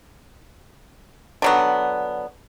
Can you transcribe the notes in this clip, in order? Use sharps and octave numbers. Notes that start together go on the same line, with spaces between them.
D3 F#3 B3